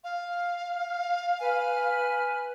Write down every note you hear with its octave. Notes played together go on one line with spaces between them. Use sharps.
F5
B4 G#5 F6